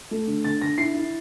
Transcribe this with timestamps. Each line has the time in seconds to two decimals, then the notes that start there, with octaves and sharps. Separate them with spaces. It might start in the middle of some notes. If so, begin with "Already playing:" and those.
0.11 A3
0.27 D3
0.44 D3 A6
0.61 D3 A#6
0.78 E4 C7
0.94 E4